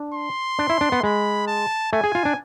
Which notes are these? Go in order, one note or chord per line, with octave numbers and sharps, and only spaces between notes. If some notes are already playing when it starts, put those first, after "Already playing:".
Already playing: D4
C6
D4
E4
D4
B3
G#3 B5
A5
A3 G#5
G#4
F4
D4